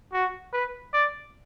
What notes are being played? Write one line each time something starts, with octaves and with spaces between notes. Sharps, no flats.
F#4
B4
D5